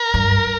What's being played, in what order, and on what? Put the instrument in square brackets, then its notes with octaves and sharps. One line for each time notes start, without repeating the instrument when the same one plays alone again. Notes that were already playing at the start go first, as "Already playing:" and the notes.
Already playing: [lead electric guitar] A#4
[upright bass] G2